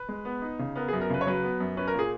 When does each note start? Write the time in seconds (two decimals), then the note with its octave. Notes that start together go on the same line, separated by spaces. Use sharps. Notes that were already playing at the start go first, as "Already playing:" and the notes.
Already playing: B4
0.09 G#3
0.25 B3
0.42 D#4
0.59 C#3
0.76 B3 A#4
0.88 G#4
0.93 F#2
1.01 A#4
1.10 C#3 B4
1.21 C#5
1.27 F#3 B4
1.43 B3
1.60 F#2
1.77 C#4 B4
1.88 A#4
1.94 A#2 G#4